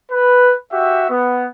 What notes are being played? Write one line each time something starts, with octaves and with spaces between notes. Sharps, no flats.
B4
F#4 G4 E5
B3